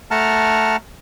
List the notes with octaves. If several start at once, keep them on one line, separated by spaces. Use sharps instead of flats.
A3 F#5 A5 A#5 F6